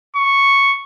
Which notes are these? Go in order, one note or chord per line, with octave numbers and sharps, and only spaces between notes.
C#6